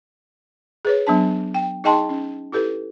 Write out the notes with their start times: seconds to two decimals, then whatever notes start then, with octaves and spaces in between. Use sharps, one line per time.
0.85 G#4 B4 C#5
1.07 F#3 B3 D4 A5
1.54 G5
1.84 D#4 G#4 D#5 G5 A5 C6
2.09 C#4
2.52 E4 G4 A4 B4